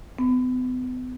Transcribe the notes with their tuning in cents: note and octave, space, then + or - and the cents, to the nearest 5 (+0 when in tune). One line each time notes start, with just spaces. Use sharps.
B3 +40